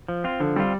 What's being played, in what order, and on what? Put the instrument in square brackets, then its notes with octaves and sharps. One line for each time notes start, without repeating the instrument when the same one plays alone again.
[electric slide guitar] F3
C4 F4
[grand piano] D3 [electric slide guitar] F3
[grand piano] G3 [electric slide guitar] C4 F4